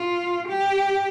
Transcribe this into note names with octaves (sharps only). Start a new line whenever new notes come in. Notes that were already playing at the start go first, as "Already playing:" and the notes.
Already playing: F4
G4